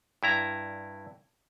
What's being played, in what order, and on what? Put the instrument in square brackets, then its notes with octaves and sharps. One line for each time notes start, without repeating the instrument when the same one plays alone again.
[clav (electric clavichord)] G2 E4 A#5